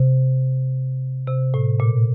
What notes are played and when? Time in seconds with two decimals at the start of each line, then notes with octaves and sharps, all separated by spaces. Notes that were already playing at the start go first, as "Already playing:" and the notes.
Already playing: C3
1.28 C3
1.54 A2
1.80 A#2